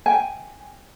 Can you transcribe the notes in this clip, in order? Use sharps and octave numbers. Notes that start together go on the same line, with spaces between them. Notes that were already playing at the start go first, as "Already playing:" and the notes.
G5 G#5